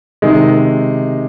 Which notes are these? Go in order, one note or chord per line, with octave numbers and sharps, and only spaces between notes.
C3 D#3 G#3